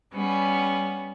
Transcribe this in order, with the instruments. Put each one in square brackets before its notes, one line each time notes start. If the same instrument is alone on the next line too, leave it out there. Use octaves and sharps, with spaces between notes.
[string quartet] G3 B3 C#4